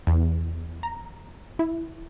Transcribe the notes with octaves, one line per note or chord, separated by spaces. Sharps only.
E2
A#5
E4